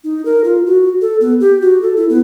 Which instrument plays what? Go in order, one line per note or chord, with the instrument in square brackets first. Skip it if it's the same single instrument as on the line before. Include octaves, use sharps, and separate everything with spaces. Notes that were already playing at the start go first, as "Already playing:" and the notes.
[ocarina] D#4
A#4
F4
F#4
A4
B3
G4
F#4
A4
E4
B3